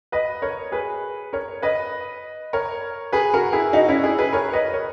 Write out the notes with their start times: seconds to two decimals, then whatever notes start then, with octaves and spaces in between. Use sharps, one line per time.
0.12 B4 D#5
0.42 A#4 C#5
0.72 G#4 B4
1.33 A#4 C#5
1.62 B4 D#5
2.53 A#4 C#5
3.12 G#4 B4
3.34 F#4 A#4
3.53 E4 G#4
3.73 D#4 F#4
3.88 C#4 E4
4.03 E4 G#4
4.18 G#4 B4
4.33 A#4 C#5
4.53 B4 D#5
4.73 A#4 C#5